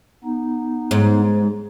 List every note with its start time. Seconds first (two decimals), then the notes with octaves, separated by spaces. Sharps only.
0.24 B3 D#4
0.91 G#2